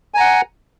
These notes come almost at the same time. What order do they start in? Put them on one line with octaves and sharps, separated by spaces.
G#5 A#5 F#5